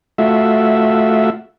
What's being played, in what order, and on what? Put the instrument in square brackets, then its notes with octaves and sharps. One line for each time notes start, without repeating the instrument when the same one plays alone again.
[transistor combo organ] A3 F4 F#4 E5